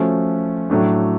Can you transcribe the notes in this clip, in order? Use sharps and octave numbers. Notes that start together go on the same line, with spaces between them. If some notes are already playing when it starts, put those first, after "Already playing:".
Already playing: F3 A3 C#4 F#4
A2 F#3 A3 D4